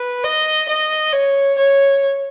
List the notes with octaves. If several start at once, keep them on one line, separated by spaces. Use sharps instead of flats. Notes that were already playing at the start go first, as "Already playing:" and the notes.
Already playing: B4
D#5
D#5
C#5
C#5